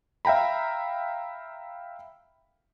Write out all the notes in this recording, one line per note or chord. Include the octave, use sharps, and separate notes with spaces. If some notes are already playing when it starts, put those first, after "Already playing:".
E5 F5 G5 A#5 B5